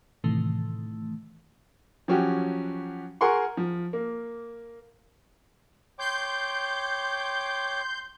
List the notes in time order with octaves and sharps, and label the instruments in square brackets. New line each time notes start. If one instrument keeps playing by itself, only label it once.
[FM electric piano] A2 C3 D#3 E3 A3
[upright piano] F3 F#3 C#4 F#4 G4
G#4 A#4 F#5 C6 C#6
F3
A#3
[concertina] C#5 G5 D6 [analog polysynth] C6 G6